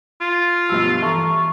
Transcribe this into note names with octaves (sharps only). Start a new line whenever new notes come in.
F4
B1 G2 F3 E6
E3 A4 A#5 C#6